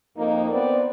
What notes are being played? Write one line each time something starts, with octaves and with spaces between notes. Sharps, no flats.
F2 A#3 D#4
B3 C4 D5